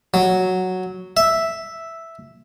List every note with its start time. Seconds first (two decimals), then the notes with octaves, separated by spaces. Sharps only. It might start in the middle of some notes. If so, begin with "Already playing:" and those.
0.14 F#3
1.17 E5